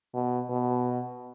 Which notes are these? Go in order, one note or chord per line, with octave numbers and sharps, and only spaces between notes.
B2
B2